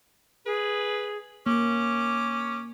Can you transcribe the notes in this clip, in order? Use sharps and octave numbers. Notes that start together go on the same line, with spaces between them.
G#4 B4
A#3 C#4 D6